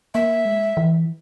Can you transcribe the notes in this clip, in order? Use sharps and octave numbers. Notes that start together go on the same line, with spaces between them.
A#3 E5
G#3
E3